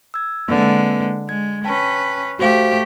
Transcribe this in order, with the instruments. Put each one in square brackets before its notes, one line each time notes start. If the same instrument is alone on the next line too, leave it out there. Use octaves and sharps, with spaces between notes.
[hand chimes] E6 G#6
[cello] D3 G#3 [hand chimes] A#3 C4 B4
[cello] G#3 [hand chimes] G#6
[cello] C#4 B4 [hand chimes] G5 A5
[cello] A3 G4 [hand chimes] F#4 C5 F5